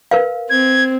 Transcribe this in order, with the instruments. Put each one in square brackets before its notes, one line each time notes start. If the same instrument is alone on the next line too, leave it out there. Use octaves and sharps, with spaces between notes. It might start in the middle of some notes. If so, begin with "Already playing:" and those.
[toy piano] A#4 B4 F5
[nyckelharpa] C4 [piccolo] G#6